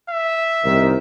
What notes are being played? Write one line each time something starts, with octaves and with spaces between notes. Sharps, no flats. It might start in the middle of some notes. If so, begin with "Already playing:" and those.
E5
C2 D#3